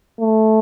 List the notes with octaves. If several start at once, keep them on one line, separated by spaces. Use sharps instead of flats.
A3